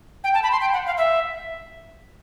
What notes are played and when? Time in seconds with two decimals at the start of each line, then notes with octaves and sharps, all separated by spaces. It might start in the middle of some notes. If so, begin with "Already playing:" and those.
0.24 G5
0.34 A5
0.43 B5
0.52 C6
0.61 G5
0.73 F#5
0.86 F5
0.98 E5